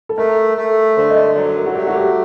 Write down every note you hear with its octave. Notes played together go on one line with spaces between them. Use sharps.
A4
A3 A#4
A3
D3 C5
D#5
D5
F#3 D5
A#4
F#4
A3 G4
F#4
G4